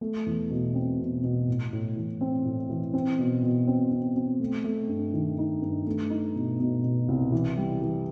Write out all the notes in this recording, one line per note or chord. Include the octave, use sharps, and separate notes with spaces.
A3
E2
B2
C4
B2
B2
A2
A2
E3
C4
A2
E3
C4
B2
B2
C4
C4
C4
A3
A3
G2
D#3
D#4
G2
A3
D#4
B2
B2
B2
C2
E3
G3
E3